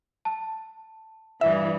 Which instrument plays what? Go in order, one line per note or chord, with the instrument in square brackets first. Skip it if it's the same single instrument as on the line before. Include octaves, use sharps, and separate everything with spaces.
[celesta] A5
[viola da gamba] G2 E3 [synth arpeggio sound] E5